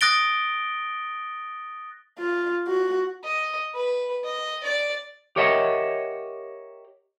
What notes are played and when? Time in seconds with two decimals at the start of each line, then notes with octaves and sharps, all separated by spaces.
0.01 D#6 F#6 A6 A#6 D7 G7
2.18 F4
2.67 F#4
3.24 D#5
3.75 B4
4.24 D#5
4.63 D5
5.36 G4 A#4 C#5 D#5 E5 F#5